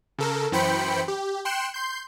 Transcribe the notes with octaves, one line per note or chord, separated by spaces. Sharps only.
C#3 A4 A#4
F#2 E3 C5 G5 B5 C#7
G4
G5 C6 F#6 C#7 E7
C6 G6